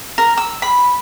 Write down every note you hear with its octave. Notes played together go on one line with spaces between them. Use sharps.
A#4
E6
B5